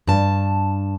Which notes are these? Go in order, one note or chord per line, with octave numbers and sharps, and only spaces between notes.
G2 A5